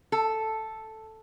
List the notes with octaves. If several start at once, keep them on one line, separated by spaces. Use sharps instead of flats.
A4